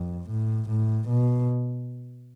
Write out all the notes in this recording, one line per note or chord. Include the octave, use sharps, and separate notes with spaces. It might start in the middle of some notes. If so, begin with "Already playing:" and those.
Already playing: F2
A2
A2
B2